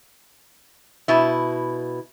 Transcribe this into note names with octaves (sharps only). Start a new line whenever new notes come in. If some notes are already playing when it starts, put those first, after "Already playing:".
B2 E4